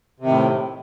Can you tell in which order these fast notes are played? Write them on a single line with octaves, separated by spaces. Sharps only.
C3 D#3 A2